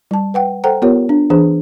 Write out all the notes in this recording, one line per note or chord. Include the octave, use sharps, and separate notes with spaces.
G3 A5
B4 F#5 G5
A4 C5 F#5 G5 A#5
B3 F4 G4 A#4 C#5
D4
E3 D4 G#4 C5